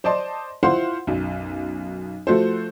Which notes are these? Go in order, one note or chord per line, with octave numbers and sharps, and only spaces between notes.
C5 D5 D#5 A5 C6
E4 F4 C5 F5 F#5 C6
B1 F#2
F3 A3 F#4 A4 C5